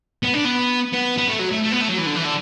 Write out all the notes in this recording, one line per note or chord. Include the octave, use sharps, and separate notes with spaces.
B3
D4
B3
B3
B3
A3
F#3
A3
A3
B3
A3
F#3
E3
D3
E3
D3